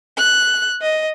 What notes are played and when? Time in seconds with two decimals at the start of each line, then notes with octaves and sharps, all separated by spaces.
0.17 F#6
0.82 D#5